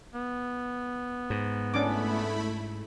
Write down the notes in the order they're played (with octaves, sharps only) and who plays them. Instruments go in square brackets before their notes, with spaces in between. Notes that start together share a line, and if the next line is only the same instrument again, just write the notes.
[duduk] B3
[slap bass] G#2
[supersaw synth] A3 E4 B5 [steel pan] C#4 D4 D6